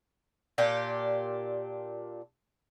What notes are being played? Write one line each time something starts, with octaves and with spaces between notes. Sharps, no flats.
A#2 D4 G4